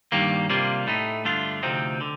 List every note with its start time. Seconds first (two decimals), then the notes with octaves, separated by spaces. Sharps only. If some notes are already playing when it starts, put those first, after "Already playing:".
0.12 G2 D#3 G3 A#3
0.49 C3 G3 A#3 F4
0.87 A2 A3 D#4
1.25 G2 D3 A3 D4 F4
1.63 D2 C3 F3 C4 D#4
2.01 D3